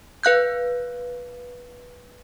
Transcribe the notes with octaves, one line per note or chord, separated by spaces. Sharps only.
B4 F5 F#6 G6